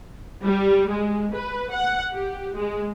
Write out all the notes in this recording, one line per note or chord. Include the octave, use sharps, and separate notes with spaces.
G3
G#3
B4
F#5
G4
G#3